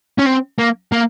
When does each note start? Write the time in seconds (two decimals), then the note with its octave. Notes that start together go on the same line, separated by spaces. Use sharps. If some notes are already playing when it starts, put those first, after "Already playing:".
0.19 C#4
0.26 C4
0.59 A#3
0.92 A#3